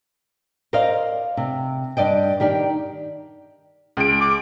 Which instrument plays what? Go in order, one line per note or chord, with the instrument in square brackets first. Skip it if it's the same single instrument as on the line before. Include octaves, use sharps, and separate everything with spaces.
[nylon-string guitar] A#4 C5 D5 D#5 F5
C3
G2 D5 D#5 G5
D#3 G4 D5 G5
[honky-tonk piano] C#2 D7
[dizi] D6